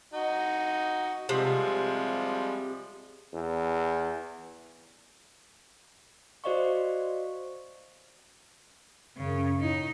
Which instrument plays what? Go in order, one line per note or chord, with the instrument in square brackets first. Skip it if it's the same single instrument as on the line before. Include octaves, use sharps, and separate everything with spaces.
[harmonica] D#4 F#4
[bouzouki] C3 [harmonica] F3 G3 G#3
[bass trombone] E2
[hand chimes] F#4 C5 D5 D#5 F5 C#6
[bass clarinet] F#2 [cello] C#3
[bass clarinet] A2 [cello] D#4